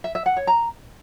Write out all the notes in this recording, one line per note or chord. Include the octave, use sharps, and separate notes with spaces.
E5
E5
F#5
C#5
A#5